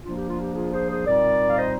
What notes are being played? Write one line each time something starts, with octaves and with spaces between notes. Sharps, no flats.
F3 A#3 D4 F4
G4
F4
G4
F4 G#4
G#4 C5
G#4 C5
A#2 G3 C4 D#4 A#4 D5
F5
C5 D#5